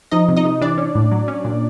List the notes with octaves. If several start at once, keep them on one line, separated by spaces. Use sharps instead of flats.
F3 D#4 D#5
C3
D#4 D#5
C3
E3 D4 D5
C#4
A2
F#3
C#4
A#2